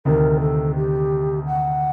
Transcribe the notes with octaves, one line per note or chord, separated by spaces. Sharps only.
D2 C3 D#3 A#4
A4
G4
F#5